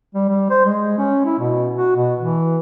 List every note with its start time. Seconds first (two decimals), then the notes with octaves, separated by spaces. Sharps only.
0.14 G3
0.29 G3
0.50 C5
0.65 G#3
0.98 C#4
1.25 E4
1.39 B2
1.74 F#4
1.96 B2
2.19 E3